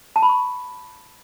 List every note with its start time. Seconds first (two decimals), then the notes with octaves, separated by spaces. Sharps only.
0.16 A5
0.22 B5
0.29 C#6